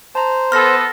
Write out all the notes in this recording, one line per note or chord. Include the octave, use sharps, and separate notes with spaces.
C5 A5 A#5
B3 A4 C6 F6 A#6